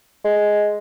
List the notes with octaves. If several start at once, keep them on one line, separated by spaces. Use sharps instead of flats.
G#3